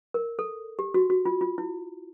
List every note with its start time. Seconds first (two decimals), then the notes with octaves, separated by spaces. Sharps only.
0.14 A#4
0.39 A4
0.79 G4
0.94 F#4
1.10 F#4
1.25 F4
1.41 F4
1.58 E4